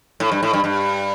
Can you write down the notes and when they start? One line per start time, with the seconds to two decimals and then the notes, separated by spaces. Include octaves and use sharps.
0.20 A2
0.32 G2
0.43 A2
0.53 G2
0.64 G2